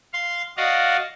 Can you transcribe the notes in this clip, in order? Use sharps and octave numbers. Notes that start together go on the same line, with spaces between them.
F5 C6
F#4 D5 D#5 F5